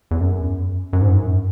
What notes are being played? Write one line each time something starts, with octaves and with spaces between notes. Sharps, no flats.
E2
F#2
F#2
G#2
F#2